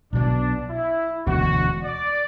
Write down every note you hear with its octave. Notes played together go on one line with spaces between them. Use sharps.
B1 B2 F#3 D4
E4
E1 D2 D3 F#4
D5